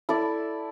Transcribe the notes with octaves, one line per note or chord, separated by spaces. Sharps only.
E4 A4 D5